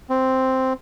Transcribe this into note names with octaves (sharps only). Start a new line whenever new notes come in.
C4